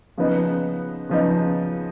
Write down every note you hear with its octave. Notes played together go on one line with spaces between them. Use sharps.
C#3 F3 B3 D#4
C#3 F3 B3 D#4